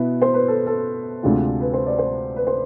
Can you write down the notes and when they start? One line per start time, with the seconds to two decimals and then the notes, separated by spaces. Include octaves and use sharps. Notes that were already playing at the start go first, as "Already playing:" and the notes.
Already playing: B2 B3 E4 B4
0.22 C5
0.34 B4
0.48 A4
0.67 A4
1.23 D2 C3 G#3 D4 F4
1.61 B4
1.73 C5
1.87 D5
1.99 C5
2.36 B4
2.47 C5